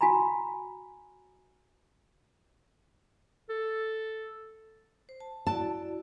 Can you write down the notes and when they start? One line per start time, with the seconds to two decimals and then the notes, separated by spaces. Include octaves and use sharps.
0.01 F#4 G#5 A#5 B5
3.49 A4
5.09 C5
5.20 A5
5.47 E4 F#4 D5 A5